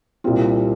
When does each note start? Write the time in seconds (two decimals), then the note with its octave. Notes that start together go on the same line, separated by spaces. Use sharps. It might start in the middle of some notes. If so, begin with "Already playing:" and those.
0.24 C2 A#2 G3 C4 F4